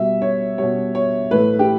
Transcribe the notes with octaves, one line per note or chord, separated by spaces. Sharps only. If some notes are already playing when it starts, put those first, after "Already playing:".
Already playing: B2 G3 E5
C#5
B2 G3 C#5
C#5
A2 E3 A3 B4
G4